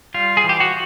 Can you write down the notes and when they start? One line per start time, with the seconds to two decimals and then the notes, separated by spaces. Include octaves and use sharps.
0.14 G3 F4
0.37 G#4
0.44 E3
0.49 G4
0.60 F#4